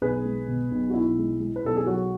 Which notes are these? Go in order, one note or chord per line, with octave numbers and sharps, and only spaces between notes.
B1 G#4 B4
G#3
B2
B1
F#4
B1 E4
G#3
G#3
B4
B1 A4
G#4
F#3 F#4